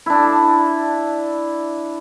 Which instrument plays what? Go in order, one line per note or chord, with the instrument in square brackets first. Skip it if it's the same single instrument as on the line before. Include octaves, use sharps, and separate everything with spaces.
[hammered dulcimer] D4 E4